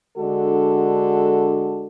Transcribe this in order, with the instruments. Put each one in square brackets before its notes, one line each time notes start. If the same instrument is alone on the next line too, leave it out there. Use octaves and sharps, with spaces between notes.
[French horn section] D3 G#3 D4 F#4 A4